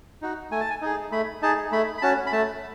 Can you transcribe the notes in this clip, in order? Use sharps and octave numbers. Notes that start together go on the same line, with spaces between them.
D#4 F#4
A3 G#5
A5
G#5
D#4 G#4
A3 B5
D#4 G#4 A5
A3 B5
B5
C#4 F#4 A5
B5
A3 A5